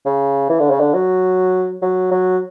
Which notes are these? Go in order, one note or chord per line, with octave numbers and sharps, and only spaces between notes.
C#3
E3
D3
C#3
D3
F#3
F#3
F#3